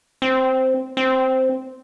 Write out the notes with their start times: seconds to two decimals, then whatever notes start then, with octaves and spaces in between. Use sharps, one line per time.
0.22 C4
0.97 C4